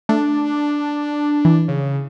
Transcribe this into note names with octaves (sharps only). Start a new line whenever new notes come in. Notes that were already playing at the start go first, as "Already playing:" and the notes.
A3 D4
E3
C#3